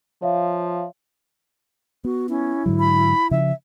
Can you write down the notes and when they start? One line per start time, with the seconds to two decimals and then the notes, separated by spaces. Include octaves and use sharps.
0.22 F3 C#5 E5 F5
2.04 B3 F#4
2.29 C#4 E4
2.66 G#2 D3 F#3
2.80 B5
3.31 C#3 F3 C#4 E5